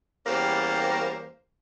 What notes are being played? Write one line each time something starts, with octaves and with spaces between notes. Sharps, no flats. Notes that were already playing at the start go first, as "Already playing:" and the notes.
E2 G3 A#3 C#4 G4 C5